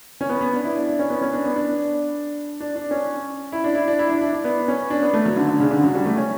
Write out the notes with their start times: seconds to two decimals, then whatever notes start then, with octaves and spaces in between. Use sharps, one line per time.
0.21 C#4
0.29 B3
0.41 B3
0.53 D4
0.64 E4
0.75 D4
0.87 D4
0.99 C#4
1.10 B3
1.22 C#4
1.33 D4
1.45 B3
1.56 D4
2.60 D4
2.76 D4
2.91 C#4
3.52 E4
3.64 D4
3.75 E4
3.88 D4
3.99 E4
4.10 D4
4.21 D4
4.33 D4
4.44 B3
4.68 C#4
4.90 D4
5.02 B3
5.14 A3
5.26 F#3
5.37 D3
5.49 D3
5.60 C#3
5.71 D3
5.83 F#3
5.95 G3
6.06 A3
6.17 C#4